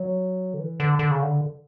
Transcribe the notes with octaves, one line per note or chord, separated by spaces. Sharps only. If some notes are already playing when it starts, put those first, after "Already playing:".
Already playing: F#3
D3
E3
D3
D3
C#3
D3